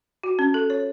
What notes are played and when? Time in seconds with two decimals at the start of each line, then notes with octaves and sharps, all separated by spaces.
0.23 F#4
0.39 C#4
0.54 A4
0.70 C#5